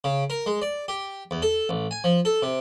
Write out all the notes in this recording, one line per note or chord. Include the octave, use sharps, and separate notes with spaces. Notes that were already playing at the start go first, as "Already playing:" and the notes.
C#3
A#4
G#3
D5
G4
E2
A4
A1
G#5
F3
A4
C3